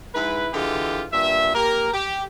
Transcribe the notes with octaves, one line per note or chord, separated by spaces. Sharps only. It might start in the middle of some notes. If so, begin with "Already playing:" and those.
G#2 E4 B4
D3 E3 G#3 F4 G4
G2 A#2 E5
A#3 G4 A#4
G4